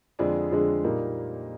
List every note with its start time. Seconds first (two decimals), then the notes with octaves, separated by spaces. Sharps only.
0.19 F2 D3 G#3 D4 G#4
0.52 F2 D3 G#3 D4 G#4
0.84 A#2 G3 A#3 D#4